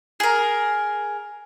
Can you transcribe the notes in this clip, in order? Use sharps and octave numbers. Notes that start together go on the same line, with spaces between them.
G#4 A#4